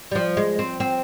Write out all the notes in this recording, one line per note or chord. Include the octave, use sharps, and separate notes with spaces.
G3
F3
G#3
C4
C4